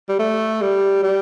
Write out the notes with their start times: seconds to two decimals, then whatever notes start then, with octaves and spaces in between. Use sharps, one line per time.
0.09 G3
0.19 A3
0.62 G3
1.03 G3